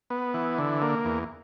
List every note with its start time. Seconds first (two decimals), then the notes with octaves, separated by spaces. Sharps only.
0.10 B3
0.34 E3
0.58 D3
0.82 A#3
1.05 E2